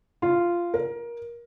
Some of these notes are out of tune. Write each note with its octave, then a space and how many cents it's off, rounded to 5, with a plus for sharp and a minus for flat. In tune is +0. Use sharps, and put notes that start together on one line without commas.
F4 -10
A#4 +20